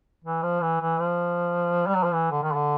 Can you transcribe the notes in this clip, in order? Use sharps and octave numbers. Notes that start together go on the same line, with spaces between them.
E3
F3
E3
E3
F3
G3
F#3
F3
E3
D3
D#3
D3